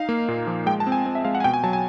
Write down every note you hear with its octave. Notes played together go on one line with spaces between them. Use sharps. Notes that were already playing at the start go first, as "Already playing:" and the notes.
Already playing: D#4 F5
A#3
A#2
F3
G#3 G5
A5
C4
G#5
C4
E5
G#3 F5
F#5
G#5
B2 G5
G#5
F#3 A5
G#5